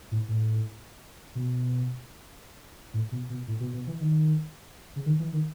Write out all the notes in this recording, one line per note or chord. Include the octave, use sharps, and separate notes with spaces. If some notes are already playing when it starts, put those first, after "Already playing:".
A2
A2
B2
A2
B2
B2
A2
B2
B2
E3
D#3
C#3
D#3
E3
D#3